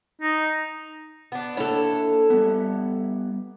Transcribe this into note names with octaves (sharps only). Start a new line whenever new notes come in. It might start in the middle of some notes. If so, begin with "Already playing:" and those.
D#4
B3 D4
A#3 D4 E4 A4 C#5
G3 B3